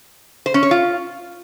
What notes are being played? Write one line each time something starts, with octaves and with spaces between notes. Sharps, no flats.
C5
C#4
C#5
F4